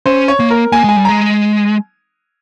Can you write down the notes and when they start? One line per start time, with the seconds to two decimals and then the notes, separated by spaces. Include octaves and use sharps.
0.06 C#4 C5
0.28 C#5
0.40 A#3
0.51 A#4
0.72 A#3 G#5
0.84 G#3 G#5
0.96 G3
1.05 G#3 A#5